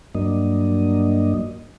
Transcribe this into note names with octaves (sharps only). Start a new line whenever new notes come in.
G2 F#3 A#3 D4 D#5